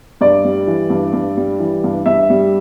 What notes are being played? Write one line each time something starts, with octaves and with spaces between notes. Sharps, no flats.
G2 D5
G3
E3
G2
G2
G3
E3
G2
G2 E5
G3